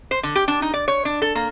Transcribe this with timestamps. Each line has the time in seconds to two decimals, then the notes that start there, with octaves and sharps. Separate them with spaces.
0.11 C5
0.23 D3
0.36 G4
0.48 D4
0.62 D#4
0.74 D5
0.88 C#5
1.05 D4
1.22 A4
1.35 A#3